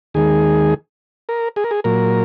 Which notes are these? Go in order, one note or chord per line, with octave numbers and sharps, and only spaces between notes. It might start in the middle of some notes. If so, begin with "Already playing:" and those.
D#2 D#3 G#3 G#4
A#4
G#4
A#4
G#4
A#2 F#3 A#4